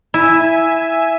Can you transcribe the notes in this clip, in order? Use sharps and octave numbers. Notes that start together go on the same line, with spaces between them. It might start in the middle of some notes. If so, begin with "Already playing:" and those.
E4 E5 G#5